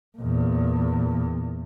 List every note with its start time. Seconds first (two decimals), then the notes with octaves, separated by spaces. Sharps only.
0.17 E2 A#2